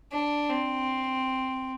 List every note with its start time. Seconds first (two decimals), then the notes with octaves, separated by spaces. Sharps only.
0.12 D4
0.50 C4